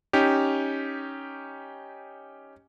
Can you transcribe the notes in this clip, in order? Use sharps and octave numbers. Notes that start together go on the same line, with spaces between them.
C#4 D#4 G4